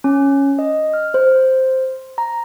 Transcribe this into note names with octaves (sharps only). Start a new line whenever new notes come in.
C#4
D#5
F6
C5
A#5